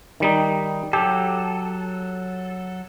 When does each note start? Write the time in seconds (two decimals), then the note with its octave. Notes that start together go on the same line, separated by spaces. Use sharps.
0.20 D#3 G3 D#4
0.93 F#3 G4 A4